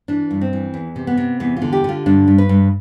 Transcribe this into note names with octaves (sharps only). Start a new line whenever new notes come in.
E3 D4
G2
C4
E3
E2
C3
B3
C3
E2 B3
D3 F4
G4
D3 F4
G2 D4
G2
B4
G2